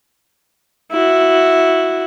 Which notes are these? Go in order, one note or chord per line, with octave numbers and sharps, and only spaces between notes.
E4 F#4